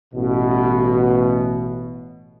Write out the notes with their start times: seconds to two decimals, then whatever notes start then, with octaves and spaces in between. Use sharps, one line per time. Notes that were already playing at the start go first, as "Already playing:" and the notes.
0.13 A1 B2